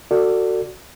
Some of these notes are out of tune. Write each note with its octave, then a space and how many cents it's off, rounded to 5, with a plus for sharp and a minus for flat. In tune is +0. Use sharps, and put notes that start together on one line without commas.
F#4 +0 A4 +30 D5 +0